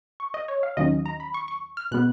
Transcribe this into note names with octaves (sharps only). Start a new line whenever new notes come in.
C#6
D#5
C#5
F5
D#2 D#3 F#3 C#4 D#5
A#5
B5
C#6
C#6
F6
B2 G#3 B3 F#6